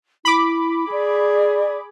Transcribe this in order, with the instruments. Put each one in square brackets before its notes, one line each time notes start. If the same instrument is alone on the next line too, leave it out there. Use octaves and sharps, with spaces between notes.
[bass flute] E4 [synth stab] B5 D6
[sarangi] G#4 [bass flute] D5